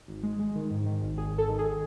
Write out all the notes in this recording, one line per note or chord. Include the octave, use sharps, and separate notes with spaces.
G#1
G#3
G#3
D#3
G#2
D#3
G#1
G#1 G#4
G#1
A4
D#3
G#4
D#3